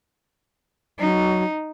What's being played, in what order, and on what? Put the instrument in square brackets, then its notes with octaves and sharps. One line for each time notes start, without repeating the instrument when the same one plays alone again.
[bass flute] F#3 [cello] D#4